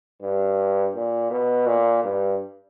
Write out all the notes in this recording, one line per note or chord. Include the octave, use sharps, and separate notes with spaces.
G2
A#2
B2
A#2
G2